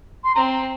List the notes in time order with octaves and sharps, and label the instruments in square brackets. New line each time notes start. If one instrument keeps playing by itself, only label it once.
[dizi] C6
[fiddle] C4 [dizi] A#5